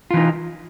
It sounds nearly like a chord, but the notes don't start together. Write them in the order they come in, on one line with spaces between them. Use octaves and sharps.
F4 E3 D#4